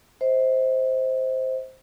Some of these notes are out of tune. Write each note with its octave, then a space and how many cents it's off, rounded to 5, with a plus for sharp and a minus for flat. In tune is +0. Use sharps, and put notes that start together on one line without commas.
C5 +0 D#5 +45